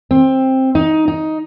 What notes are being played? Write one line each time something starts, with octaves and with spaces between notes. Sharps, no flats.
C4
D#4
D#4